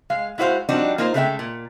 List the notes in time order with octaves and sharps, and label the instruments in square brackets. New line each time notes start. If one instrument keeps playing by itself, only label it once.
[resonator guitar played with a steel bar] G#3 F5
G#3 E4 F#4 C5 F5
F3 G3 C4 D4 D#4 F#4
A#3 D#4 F4 A#4 C5
C#3 G#3 A3 G#4 E5 G5
A#2